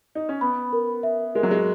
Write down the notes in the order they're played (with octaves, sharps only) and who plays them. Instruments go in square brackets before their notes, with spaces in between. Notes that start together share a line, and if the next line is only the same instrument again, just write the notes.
[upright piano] D#4
C#4
[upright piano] B3 [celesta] B5
[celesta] A#4
E5
[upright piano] G#3 [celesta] A#4
[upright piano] F#3
G#3